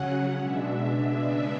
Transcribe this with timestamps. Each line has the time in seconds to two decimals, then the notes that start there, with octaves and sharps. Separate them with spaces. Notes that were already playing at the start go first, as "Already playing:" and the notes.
Already playing: C#3 F#3 C#4 F#5
0.39 B2 G#3 D4 E5
1.23 C#3 G#3 B3 D4